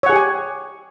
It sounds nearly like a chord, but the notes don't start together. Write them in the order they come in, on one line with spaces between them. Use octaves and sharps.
C#5 F#5 G#4 G4 G#5